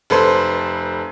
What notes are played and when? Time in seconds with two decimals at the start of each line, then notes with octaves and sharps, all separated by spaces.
0.10 F1 A4 B4 C5 C6